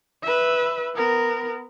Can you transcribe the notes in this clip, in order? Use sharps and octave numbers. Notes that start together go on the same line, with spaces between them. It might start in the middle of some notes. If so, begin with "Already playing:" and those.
B4 E5
B3 A#4